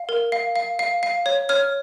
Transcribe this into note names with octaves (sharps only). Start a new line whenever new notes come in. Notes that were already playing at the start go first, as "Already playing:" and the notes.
Already playing: F5
A#4
F5
F5
F5
F5
C#5
C#5 F6